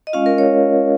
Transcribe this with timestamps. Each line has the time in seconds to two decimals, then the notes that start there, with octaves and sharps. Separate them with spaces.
0.07 D#5
0.13 G#3 C#4 F4 F5
0.26 A#4
0.38 C#5